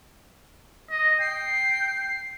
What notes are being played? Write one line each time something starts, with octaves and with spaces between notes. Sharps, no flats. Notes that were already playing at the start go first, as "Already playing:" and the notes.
D#5
G5 C7